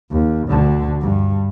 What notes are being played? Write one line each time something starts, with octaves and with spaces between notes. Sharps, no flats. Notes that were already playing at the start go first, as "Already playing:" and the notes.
D#2
D2 D3
G2